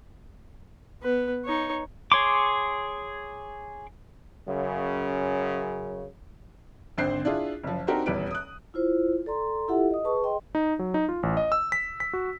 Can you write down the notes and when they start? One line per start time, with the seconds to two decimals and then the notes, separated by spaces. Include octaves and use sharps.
1.03 B3 B4
1.45 D#4 C#5
2.12 G#4 C#5 C6 D6
4.48 F#2 C#3
6.98 G#1 D3 C4 C5 F#6 C7
7.25 D4 E4 F4 G#4
7.63 F#1 F3
7.87 C4 D4 D#4 F#4 G4 A#4
8.06 D#1 E2 G3 B4 D7
8.31 D#6 F#6
8.74 E4 F4 C5
9.26 A4 D5 A#5 C6
9.68 E4 F4 G4 A4 E5 F#5
9.90 D#5 D#6
10.04 G#4 B4 A5 C#6
10.23 G#4 D#5 G5 C6
10.55 D#4
10.79 F#3
10.94 D#4
11.09 F4
11.23 A1
11.37 D#5
11.52 E6
11.72 B6
12.00 B6
12.13 F#4